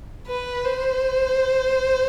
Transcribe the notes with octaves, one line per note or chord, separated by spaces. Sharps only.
B4
C5